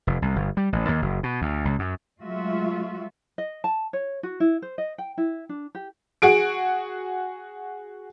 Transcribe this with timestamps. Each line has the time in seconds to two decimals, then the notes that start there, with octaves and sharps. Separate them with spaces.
0.07 F1
0.22 C2
0.36 G1
0.57 G3
0.73 A1
0.88 D#2
1.02 F#1
1.23 B2
1.42 D2
1.65 C#2
1.79 F#2
2.21 F#3 G#3 A3 F4 F#4 E5
3.38 D#5
3.64 A5
3.93 C#5
4.23 F#4
4.40 E4
4.62 C5
4.78 D#5
4.98 G5
5.18 E4
5.49 D4
5.75 G4
6.22 F#4 G#4 D7